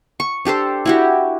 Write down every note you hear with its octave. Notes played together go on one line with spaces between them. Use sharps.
C#6
D4 G4 A4 C5
E4 F#4 G4